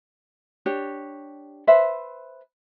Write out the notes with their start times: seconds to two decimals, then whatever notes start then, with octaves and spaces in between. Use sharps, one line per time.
0.66 D4 G4 C#5
1.67 B4 C5 E5